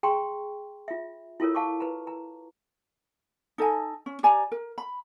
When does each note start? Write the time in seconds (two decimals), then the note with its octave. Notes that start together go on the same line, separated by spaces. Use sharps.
0.03 G#4 G5 A#5 C6 C#6
0.88 F4 E5
1.40 E4 F4 A4 A#4 C#5
1.55 F5 A5 C#6 D6
1.80 B4 A#5
2.07 A#5
3.58 D#4 A4 D#5 G#5
4.06 C#4
4.23 G4 D5 G#5 A#5
4.52 A#4
4.78 B5